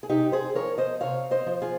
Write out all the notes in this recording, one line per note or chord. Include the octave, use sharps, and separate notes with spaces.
G#4
C3 D#4 G4
G#4 C5
F3 A#4 C#5
C5 D#5
C3 C#5 F5
C5 D#5
F3
F4 G#4